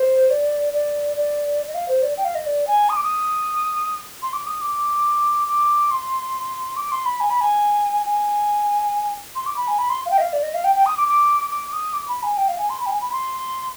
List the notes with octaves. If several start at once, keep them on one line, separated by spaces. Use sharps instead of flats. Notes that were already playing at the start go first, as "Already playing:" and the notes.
Already playing: C5
D5
D5
D5
D#5
F5
C5
D5
G5
F5
D#5
D5
G#5
D#6
D6
D#6
C6
D6
D#6
D6
D6
C6
D6
C6
B5
G#5
B5
G#5
G#5
C6
D6
B5
G#5
B5
C6
F5
G5
D#5
F5
D5
D#5
F5
G5
G5
D#6
D6
D6
D6
D#6
D6
B5
G#5
G5
F5
G#5
C6
B5
G5
G#5
B5
C6